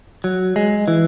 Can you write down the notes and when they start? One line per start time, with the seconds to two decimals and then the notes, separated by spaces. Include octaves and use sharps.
0.24 F#3
0.56 G#3
0.88 E3